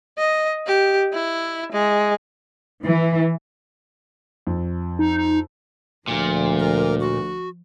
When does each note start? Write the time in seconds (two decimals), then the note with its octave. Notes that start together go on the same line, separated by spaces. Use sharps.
0.18 D#5
0.67 G4
1.13 E4
1.73 G#3
2.83 E3
4.47 F2
4.99 D#4
6.08 D2 A#2 F3
6.59 A#4
7.00 F#4